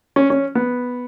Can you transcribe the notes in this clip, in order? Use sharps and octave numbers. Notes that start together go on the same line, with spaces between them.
C#4
C#4
B3